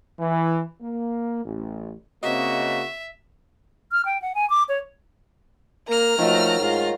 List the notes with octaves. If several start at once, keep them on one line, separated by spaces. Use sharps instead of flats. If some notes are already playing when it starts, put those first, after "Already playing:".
E3
A#3
A1
C#3 A#3 C4 F#4 D#5 E5
F6
G5
F#5
G#5
D6
C#5
A#3 A#4 A#5 F6
D#3 F3 F#3 A3
G#2 F4